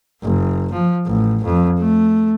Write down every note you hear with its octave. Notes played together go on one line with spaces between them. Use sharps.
F#1
F3
A1
F2
A3